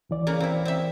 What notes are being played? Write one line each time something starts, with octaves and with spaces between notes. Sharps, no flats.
C#2 E3 D5
C#3 A#3 A#5
C4 E4
C4 E5